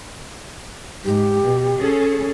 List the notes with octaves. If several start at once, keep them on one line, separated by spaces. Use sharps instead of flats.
G#2 G4
B2
C#4 G#4 A4